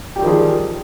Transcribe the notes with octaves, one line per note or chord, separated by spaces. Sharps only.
D#3 F3 G3 G4 G#4